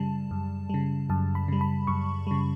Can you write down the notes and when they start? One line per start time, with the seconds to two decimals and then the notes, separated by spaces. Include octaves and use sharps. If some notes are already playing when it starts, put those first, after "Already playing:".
Already playing: F#2 C#3 G3 A5
0.31 F#2
0.70 C#3 G3
1.10 F#2 A5
1.35 B5
1.48 C#3 G3
1.61 B5
1.87 F#2 C#6
2.27 C#3 G3